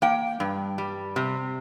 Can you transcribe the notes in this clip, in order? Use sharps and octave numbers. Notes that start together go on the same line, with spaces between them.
A#3 G5
G2
G3
C3